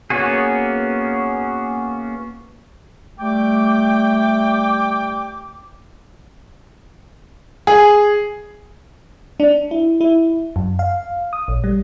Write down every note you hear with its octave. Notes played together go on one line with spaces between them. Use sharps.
A#3 B3 C#4 F#4 G#4
G3 A3 G5 D6
G#4
D4
E4
E4
F#2
F5
D#6
A#1
G3